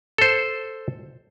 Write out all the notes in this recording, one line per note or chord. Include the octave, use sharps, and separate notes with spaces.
A4 C5